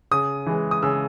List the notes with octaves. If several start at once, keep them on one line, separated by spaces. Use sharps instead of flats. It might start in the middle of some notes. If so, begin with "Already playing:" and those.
C#3 D#6
E3 G#3
D#6
C#3 E6